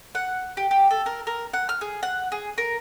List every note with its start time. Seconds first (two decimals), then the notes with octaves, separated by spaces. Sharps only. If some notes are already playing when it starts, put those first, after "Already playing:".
0.15 F#5
0.57 G4
0.71 G4
0.90 A4
1.06 A#4
1.27 A#4
1.53 F#5
1.69 F6
1.81 G#4
2.03 F#5
2.32 G#4
2.58 A#4